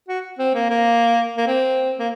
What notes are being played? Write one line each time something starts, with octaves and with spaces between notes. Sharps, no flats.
F#4
C4
A#3
A#3
A#3
C4
A#3